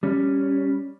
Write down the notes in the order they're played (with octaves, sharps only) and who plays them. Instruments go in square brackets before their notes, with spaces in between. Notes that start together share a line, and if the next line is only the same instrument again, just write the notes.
[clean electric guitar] G3 C#4